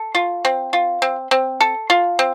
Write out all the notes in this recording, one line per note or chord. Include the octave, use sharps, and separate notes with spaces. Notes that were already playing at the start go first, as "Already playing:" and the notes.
Already playing: A4
F4
C4
F4
C4
C4
A4
F4
C4